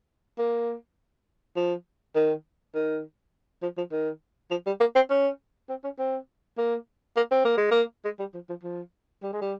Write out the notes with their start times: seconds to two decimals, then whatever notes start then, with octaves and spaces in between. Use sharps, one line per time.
0.39 A#3
1.56 F3
2.15 D#3
2.75 D#3
3.62 F3
3.77 F3
3.92 D#3
4.50 F3
4.66 G3
4.80 A#3
4.95 C4
5.10 C#4
5.69 C4
5.84 C#4
5.99 C4
6.58 A#3
7.16 A#3
7.31 C4
7.45 A#3
7.57 G#3
7.71 A#3
8.05 G#3
8.19 G3
8.34 F3
8.49 F3
8.63 F3
9.23 G3
9.33 G#3
9.41 G3